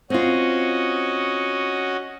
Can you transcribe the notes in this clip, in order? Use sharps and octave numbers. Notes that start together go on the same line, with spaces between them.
C4 C#4 F4 F#4 D#5